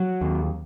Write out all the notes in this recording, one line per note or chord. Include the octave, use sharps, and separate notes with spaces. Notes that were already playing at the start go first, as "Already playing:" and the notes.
Already playing: F#3
D#2